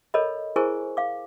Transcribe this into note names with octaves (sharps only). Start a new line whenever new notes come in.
A4 A#4 C#5 D#5 B5
E4 G#4 A#4 C5 G#5 C#6
F5 D6